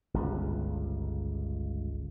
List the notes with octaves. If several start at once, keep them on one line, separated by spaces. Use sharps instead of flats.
G1 C#2